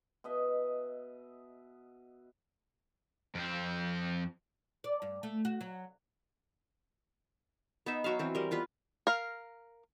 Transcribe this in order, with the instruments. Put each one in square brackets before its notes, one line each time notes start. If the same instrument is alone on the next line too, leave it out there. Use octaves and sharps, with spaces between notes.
[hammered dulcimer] B2 D#5 E5
[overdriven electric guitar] F2 C4
[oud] D5
G2
A3
F#4
F#3
[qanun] B3 D#4 E5
F#3 F#4 E5 F5
E3 C4
G3 A#4
B3 F4 B4
[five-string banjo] A#4 F5